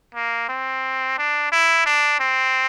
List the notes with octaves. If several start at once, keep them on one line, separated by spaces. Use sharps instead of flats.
A#3
C4
D4
E4
D4
C4